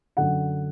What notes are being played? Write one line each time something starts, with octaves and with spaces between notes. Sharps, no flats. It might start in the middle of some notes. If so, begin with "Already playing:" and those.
F#2 D3 F#5